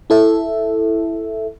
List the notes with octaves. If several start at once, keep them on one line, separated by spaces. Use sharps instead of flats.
E4 A4 E5